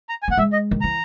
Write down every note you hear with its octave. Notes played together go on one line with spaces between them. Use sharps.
A#5
G#5
A#3 F#5
G#3 E5
D#5
D#3
E3 A#5